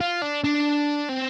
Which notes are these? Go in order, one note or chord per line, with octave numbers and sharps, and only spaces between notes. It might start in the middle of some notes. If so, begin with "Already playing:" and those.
F4
D4
D4
C4